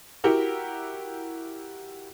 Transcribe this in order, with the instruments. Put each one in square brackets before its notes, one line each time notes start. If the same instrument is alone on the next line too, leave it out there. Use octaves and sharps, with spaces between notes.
[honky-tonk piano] E4 F#4 G4 A#4 F#5